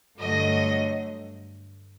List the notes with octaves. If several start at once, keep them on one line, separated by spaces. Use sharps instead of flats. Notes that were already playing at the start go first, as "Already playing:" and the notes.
G2 D3 F#3 A3 D#5